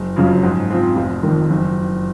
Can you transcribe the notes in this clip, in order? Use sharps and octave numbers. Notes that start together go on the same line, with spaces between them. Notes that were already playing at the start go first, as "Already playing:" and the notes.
Already playing: F#1
F2 C#3 F#3
G#2
F3 C4
F1
F2 D#3
F#1